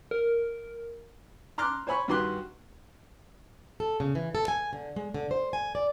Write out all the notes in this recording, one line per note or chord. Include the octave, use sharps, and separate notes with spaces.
A#4
A#5 C6 D6 F6 F#6
C5 C#5 G#5 B5 C#6
G2 D#3 F#4 G4 C6 F#6
A4
C#3
E3
A4
G#5
D3
G#3
D3
C5
G#5
D5